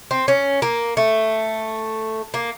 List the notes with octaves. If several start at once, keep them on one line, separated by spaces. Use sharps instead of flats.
C4
C#4
A#3
A3
A#3